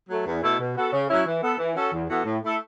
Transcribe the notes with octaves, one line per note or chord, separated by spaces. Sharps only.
F#3 A3
E2
B2 A3 E4 A4
B2
B3 F#4 A4
C#3
F#3 C#4 E4
E3
B3 A4
E3
C#4 F#4 A4
E2
E3 B3 F#4 A4
A2
A3 E4 A4